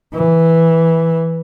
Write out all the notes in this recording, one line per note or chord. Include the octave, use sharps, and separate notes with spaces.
E3